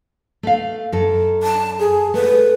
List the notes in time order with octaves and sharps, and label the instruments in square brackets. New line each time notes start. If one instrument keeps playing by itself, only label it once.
[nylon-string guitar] A3 F5
F#2 A4
[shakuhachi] A5
G#4
[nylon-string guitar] A3 [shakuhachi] B4